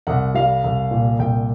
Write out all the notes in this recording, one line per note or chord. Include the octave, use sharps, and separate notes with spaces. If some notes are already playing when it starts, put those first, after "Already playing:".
C2 F#5
G3 F5
C2
A#2
C2 G5